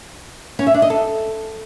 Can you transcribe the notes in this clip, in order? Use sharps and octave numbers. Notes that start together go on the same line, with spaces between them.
C#4
E5
D4
D#5
A4